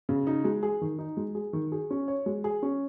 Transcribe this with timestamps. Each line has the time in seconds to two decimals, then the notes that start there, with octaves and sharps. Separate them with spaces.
0.09 C#3
0.27 D#4
0.45 G#3
0.63 G#4
0.81 D#3
0.99 D#4
1.17 G#3
1.35 G#4
1.53 D#3
1.72 G#4
1.91 C#4
2.08 C#5
2.26 G#3
2.44 G#4
2.63 C#4